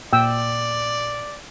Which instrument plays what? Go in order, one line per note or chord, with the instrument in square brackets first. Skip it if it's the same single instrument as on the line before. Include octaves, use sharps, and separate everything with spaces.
[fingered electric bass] A#2 [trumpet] D5 [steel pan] G5 E6